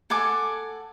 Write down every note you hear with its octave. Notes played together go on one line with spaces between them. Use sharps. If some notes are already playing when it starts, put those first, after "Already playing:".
A4 F#5 G#5 D6